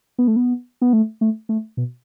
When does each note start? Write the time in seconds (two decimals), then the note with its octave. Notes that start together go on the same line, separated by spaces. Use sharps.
0.18 B3
0.28 A3
0.36 B3
0.82 B3
0.93 A3
1.21 A3
1.49 A3
1.77 B2